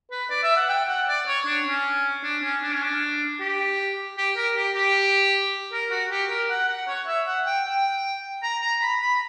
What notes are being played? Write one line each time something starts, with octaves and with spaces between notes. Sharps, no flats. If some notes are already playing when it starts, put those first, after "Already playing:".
B4
D5
E5
F#5
G5
F#5
D5
C#5
D4
C#4
D4
C#4
D4
C#4
D4
G4
G4
A#4
G4
G4
A#4
F#4
G4
A#4
F#5
F#5
C#5
E5
F#5
G5
G5
A#5
A#5
B5
B5